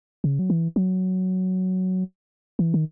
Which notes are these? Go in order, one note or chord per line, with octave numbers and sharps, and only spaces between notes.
C#3
F#3
E3
F#3
E3
D#3